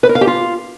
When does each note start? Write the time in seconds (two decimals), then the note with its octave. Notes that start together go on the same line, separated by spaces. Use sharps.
0.03 B4
0.09 A#4
0.15 F5
0.21 G4
0.27 F4